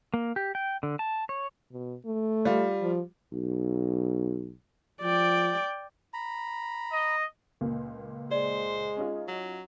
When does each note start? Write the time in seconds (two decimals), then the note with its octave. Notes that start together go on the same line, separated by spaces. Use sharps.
0.14 A#3
0.36 G4
0.55 G5
0.83 D3
0.99 A5
1.29 C#5
1.72 B2
2.06 A3
2.45 G3 F4
2.82 F3
3.33 B1
5.02 F3 D5 G5
6.13 A#5 B5
6.92 D#5
7.61 C#2 A#2 A#3
8.31 G#3 C5 D5
8.97 C#4 D#4 F4
9.28 F#3